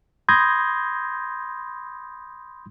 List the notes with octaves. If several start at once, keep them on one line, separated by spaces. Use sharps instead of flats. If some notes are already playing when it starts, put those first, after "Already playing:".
B5 C6 D#6 G6 G#6 A#6